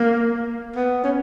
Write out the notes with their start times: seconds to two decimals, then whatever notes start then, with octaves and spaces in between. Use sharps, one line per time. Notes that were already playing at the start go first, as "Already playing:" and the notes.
Already playing: A#3
0.76 B3
1.04 C#4